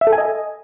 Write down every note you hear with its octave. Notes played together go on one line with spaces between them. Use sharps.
E5
A4
G#5
D#5